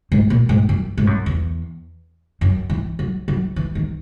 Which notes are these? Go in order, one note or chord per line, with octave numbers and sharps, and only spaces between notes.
G#2
A#2
G#2
F#2
G#2
F#2
E2
F#2
E3
F#3
F#3
E3
D#3